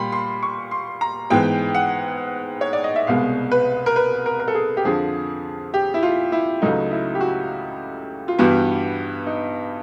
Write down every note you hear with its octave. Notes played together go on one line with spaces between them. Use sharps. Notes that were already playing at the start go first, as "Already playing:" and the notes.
Already playing: A#2 G3 B5 C6
C6
C#6
C6
A#5
G#2 E3 G#3 B3 G5
F#5
C#5
D5
D#5
E5
C2 B2 G#3 B3 F5
B4
A#4
B4
A#4
A#4
A4
G#4
G4
F2 D3 F3 G#4
G4
E4
F4
E4
C#2 C#3 F#3 A3 D#4
E4
G4
F#4
F4
G2 E3 G3 B3 F#4
D#4